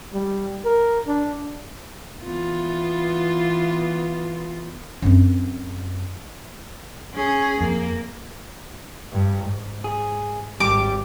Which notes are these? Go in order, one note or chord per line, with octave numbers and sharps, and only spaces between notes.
G3
A#4
D4
E3 B3 F4
F#2 C4
C#4 G#4
F2 A#3
G2
G#2
G#4
G#1 G3 G4 D6